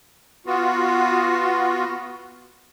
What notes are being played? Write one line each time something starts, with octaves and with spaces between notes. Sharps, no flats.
B3 F4 F#4